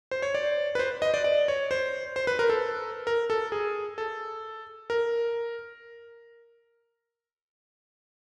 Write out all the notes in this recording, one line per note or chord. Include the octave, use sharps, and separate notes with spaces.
C5
C#5
D5
B4
C5
D#5
D5
D5
C#5
C5
C5
B4
A#4
A4
A#4
A4
G#4
A4
A#4